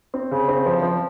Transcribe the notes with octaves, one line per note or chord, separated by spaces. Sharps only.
C4
C#3
C4
F3
F3